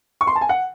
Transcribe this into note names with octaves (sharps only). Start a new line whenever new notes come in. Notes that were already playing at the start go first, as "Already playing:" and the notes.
C#6
C6
A5
G#5
F#5